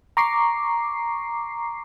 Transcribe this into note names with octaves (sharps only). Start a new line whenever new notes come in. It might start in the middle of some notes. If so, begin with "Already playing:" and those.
A#5 C#6 D6 C7